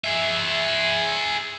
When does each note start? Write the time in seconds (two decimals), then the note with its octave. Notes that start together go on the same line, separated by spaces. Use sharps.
0.04 G#4 E5